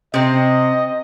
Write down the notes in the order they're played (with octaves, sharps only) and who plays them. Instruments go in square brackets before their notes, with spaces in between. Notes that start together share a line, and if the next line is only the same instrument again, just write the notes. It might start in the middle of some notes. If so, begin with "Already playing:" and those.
[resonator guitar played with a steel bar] C3 C4 [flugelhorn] D#5